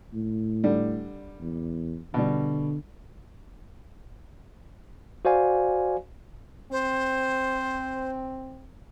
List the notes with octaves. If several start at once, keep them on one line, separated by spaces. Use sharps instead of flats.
A2
D3 G3
E2
B2 D3 G3
F#4 C5 D5 F5 G#5
C4 C5